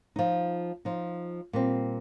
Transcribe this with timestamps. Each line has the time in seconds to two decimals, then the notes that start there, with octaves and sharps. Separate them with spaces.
0.16 F3 D#4
0.85 F3 D#4
1.53 A#2 G3 C4